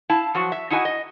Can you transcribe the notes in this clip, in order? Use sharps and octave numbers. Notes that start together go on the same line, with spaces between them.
E4 F5 A5
F3 F#3 F#4
E5
D#4 E4 F#4 D#5 G5 G#5
D#5